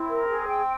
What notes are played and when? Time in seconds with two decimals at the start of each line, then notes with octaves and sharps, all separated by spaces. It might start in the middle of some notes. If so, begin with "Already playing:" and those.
Already playing: C4 E4
0.09 A#4
0.28 G#4
0.47 G5